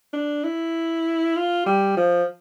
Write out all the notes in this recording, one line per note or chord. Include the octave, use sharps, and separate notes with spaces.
D4
E4
F4
G3
F3